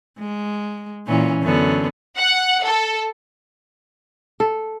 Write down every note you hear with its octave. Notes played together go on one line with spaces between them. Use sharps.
G#3
A#2 E3 C#4
F#2 D3 B3
F#5
A4
A4